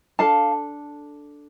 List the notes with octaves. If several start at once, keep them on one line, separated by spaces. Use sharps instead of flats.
D4 A4 F5 A5